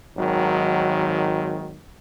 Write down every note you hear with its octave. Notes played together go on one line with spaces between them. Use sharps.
G#1 D#3 F#3